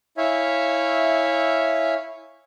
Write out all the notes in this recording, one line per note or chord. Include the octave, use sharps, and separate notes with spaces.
E4 C#5 E5 F5 G#5